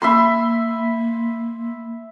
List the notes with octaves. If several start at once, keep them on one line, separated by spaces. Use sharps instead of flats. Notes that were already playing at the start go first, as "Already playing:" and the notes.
A#3 E5 B5 C6